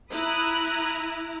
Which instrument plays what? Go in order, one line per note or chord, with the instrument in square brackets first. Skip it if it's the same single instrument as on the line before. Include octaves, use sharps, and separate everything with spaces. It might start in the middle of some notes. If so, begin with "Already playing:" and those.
[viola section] E4 A#5 [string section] B5 D#6 F#6